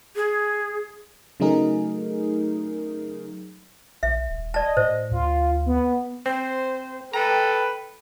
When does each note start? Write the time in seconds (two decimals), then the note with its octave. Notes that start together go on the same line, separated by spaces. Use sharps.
0.16 G#4
1.40 C#3 F#3 A3 D#4 G#4 A#4
4.03 A#1 E5
4.30 D#1
4.54 D5 D#5 A5
4.77 A2 C5
5.11 D2 F4
5.66 B3
6.26 C4 C5
7.13 A4 B4 G5 A#5